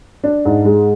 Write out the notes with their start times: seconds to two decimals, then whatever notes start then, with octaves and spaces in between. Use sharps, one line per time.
0.24 D4
0.45 G#2
0.65 G#3